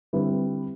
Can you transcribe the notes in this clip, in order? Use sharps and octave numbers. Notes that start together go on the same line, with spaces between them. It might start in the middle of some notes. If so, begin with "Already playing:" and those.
D3 G3 C4 E4 B4